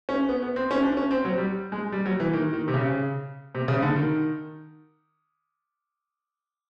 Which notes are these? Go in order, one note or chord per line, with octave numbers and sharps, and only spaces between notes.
C#4
B3
B3
C4
C#4
D4
C#4
C4
F#3
G3
G#3
G3
F#3
E3
D#3
D#3
C3
C#3
C3
C#3
D3
D#3